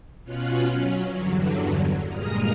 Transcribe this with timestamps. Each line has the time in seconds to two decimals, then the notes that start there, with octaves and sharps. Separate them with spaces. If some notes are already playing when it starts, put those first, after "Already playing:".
0.24 B2 C#4 F4 F6 F#6
0.69 F#3 C#4
1.10 E2 G2 D3 F#3
2.09 G2 A#2 G#3 A#5 D#6 F6